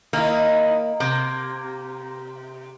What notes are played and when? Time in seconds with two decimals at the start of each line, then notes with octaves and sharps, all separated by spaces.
0.13 D#3 A#3 D#4 E4
1.00 C3 A#3